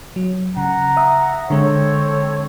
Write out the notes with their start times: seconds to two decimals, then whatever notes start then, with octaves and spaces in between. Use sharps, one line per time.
0.16 F#3
0.57 C#3 F#5 A#5
0.97 E5 D#6
1.50 D3 G#3 C4 A4 C#5